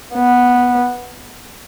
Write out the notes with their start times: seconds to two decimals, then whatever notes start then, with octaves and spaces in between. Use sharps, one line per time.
0.14 B3